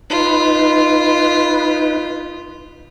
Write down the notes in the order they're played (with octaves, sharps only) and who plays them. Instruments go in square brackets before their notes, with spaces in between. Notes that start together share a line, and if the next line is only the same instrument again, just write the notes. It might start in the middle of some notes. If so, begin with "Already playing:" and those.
[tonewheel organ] D#4 B4 [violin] F4